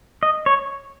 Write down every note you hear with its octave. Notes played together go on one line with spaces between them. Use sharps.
D#5
C#5